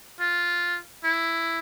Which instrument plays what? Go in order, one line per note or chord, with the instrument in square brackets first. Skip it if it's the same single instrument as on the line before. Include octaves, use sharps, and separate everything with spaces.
[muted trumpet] F4
E4